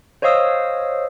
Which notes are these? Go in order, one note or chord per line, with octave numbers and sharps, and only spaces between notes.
C5 C#5 D#5 F5 D#6 E6